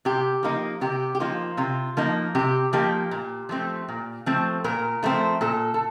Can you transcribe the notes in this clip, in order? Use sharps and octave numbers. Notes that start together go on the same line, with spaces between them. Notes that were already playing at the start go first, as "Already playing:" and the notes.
C3 G4
F3 A#3 D#4
C3 G4
G4
F3 A#3 D#4 F4
C3 F4
F3 A#3 D#4
C3 G4
F3 A#3 D#4 G4
A#2
F3 A3 C4
A#2
F3 A3 C4
A#2 A#4
F3 A3 C4
A#2 A4
A4